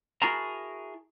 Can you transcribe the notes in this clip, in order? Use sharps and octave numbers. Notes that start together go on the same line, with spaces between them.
E4 F#4 G#4 A#4 A5 A#5